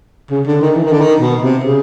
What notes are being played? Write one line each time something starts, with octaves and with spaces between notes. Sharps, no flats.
C#3
D3
D#3
E3
D#3
D3
D#3
B2
C3
C#3